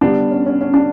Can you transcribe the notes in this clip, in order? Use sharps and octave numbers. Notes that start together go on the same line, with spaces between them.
D3 G3 B3 D4
C#4
C#4
C#4
D4